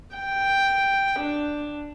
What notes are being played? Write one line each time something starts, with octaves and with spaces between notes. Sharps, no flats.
G5
D4